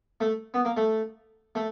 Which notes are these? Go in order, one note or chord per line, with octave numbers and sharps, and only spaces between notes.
A3
B3
A#3
A3
A3